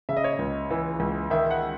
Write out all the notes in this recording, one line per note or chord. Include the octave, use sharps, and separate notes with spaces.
C#3 E5
D#5
C#5
D#5
C#2
E3
C#2
D#3 E5
F#5